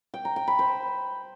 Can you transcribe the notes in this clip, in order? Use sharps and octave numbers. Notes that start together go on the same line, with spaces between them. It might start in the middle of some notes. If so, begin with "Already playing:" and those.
G5
A#5
G5
B5
C5